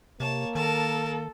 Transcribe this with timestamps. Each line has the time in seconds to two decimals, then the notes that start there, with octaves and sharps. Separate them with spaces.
0.20 C3 A#3 C#5 A5
0.55 D#3 A4 A#4 A5